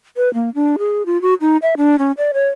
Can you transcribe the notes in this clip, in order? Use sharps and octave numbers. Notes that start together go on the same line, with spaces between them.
B4
A#3
D4
G#4
F4
F#4
D#4
E5
D4
C#4
D5
C#5